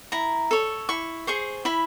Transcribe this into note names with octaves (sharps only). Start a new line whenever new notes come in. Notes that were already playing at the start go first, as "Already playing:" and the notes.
E4 A#5
A4 C#5
E4 C#6
G#4 C5 C#6
E4 B5